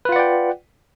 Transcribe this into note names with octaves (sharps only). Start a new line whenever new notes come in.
F4 B4 D5 F#5 G5